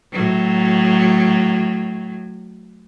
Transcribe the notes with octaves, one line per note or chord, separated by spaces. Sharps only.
A2 F#3